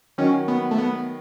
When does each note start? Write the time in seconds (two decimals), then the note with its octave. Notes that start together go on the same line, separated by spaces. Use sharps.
0.18 D#3 F#3 C#4
0.48 B3
0.71 A3
0.78 B3